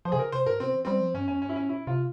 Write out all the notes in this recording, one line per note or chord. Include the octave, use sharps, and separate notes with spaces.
F3 C5
C3 G#4
C#3 A#4
C3 C5
G#2 A#4
C3 C4
E3
G3 C4
F3
G2 C#4
F2 C#4
G2 C#4
E4
G#2 C#4
A#2 E4
C3 F4